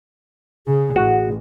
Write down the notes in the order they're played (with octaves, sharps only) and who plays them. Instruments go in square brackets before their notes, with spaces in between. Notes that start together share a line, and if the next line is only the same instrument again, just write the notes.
[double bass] C#3 [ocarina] G#4
[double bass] A1 [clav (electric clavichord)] F#4